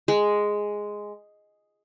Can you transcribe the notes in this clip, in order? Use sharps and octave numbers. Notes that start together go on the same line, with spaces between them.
G#3